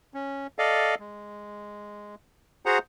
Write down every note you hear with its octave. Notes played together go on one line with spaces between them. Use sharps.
C#4
A4 D5 D#5 F5
G#3
F#4 G#4 C5 F#5 A#5